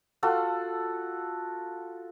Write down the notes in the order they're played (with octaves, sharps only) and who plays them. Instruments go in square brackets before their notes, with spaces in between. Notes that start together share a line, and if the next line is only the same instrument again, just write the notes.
[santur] F4 F#4 A4 F#5